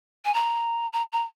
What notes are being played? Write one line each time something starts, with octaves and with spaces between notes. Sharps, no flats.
G#5
A#5
A#5
A#5